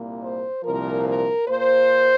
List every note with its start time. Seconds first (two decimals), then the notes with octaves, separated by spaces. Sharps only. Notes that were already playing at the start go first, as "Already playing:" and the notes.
Already playing: C2 A#2 A#3
0.21 C5
0.63 C2 A#2 F3 A#4
1.06 A#4
1.48 A#2 A#3 C5